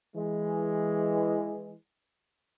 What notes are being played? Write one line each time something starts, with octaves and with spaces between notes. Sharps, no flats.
E3 G#3